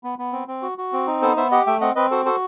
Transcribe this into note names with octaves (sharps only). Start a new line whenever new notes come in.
B3
B3
C4
C4
F#4
F#4
C4
D#4
B3 A4 C5
B3 C5 E5
G4 D#5 F#5
A3 E5 G5
C4 D#5 F#5
C4 B4 D#5
F#4 A4 C5
F#4 A4 C5